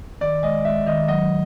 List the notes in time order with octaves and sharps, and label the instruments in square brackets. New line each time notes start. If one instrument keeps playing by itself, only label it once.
[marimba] D#3 [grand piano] D5
[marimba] G#3 [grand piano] D#5
[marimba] G#3 [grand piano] E5
[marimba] D#3 [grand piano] D#5
[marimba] F#3 [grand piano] D#5